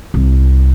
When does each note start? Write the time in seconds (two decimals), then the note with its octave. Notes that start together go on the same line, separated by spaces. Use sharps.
0.14 C2